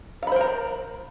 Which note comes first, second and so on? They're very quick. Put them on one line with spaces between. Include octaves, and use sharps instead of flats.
F5 B5 C5 A#4 A#5